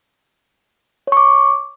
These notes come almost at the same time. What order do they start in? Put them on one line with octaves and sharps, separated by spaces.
C#5 C#6 D6